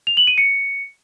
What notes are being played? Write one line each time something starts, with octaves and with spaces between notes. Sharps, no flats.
F7
F#7
D#7
C#7